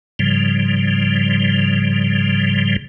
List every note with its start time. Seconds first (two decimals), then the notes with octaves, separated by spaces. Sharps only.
0.19 G#2 C#3 F3 G3